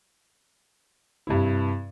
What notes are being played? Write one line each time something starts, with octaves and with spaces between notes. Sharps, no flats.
G2 C3 E4